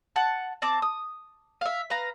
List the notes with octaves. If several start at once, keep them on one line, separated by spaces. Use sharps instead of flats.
F#5 A5
C4 A5 D6
D#6
E5 F5
B4 F5 A#5